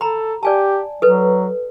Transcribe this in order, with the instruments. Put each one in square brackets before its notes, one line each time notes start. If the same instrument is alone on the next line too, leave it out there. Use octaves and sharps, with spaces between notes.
[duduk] A4 [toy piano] A#5 B5
[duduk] G4 [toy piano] D5 G#5 A5
[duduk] F#3 [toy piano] A4 B4